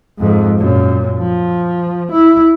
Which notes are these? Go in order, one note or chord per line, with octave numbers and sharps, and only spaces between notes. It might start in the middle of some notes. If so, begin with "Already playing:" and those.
F2 G#2
F#2 A#2
F3
E4